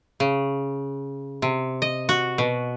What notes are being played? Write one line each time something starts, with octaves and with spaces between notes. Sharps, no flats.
C#3
C3
D#5
F#4
B2